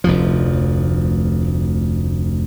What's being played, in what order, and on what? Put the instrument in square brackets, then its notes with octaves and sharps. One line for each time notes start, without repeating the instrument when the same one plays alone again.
[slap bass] F1 D2 F3